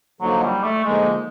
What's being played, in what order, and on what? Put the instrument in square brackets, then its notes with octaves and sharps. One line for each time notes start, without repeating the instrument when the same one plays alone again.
[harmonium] D3 F3 A#3 D#4 [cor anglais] F#3
[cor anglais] G3
A3
[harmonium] D3 F3 A#3 D#4 [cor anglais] G#3